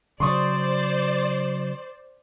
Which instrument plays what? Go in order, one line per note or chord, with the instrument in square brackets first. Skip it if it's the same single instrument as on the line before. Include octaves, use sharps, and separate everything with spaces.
[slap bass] C#3 F#3 [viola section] C5 D5 [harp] C6 C#6 D#6